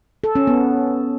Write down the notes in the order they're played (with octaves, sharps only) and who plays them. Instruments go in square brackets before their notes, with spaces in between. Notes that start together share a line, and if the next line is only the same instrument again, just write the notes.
[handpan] A4
C#4
B3